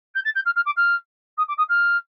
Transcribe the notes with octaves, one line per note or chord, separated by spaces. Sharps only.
G6
A6
G6
F6
F6
D6
F6
D#6
D6
D#6
F6